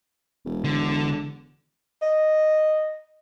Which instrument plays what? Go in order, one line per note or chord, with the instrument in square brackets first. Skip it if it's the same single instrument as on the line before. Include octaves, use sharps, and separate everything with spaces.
[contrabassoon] E1
[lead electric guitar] D3
[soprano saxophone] D#5